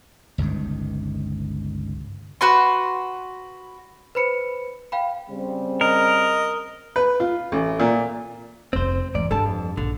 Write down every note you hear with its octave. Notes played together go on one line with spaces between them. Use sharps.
G1 C#2 G2 D#3
F#4 B4 C6
B4 C5 B5 C#7
F5 G5 B5
C#3 G3 C4
A#4 D#5
B4
F4
A1
A#2
F1 C#3 C4 C5
F1 G#2 E3 D5
G2 G3 A4 A5
F2
A#1 D3